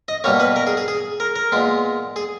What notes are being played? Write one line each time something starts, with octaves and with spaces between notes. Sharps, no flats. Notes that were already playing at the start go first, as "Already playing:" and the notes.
D#5
B2 G3 A#3 C#5
B4
A#4
G#4
G#4
G#4
A#4
A#4
A#2 G#3 B3
G#4